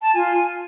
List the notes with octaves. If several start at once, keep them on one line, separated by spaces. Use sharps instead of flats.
A5
F4 G#5